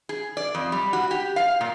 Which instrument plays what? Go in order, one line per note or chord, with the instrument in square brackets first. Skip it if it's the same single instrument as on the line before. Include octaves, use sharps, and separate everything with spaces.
[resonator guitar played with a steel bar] G#4
D5
F2
G3
F#4
G4
F5
A#2